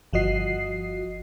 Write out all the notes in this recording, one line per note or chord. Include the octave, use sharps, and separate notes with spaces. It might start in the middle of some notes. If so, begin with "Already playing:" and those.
G1 F3 F#4 D#5 C7